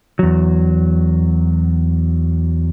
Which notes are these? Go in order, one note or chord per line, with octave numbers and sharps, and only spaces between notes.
E2 F#3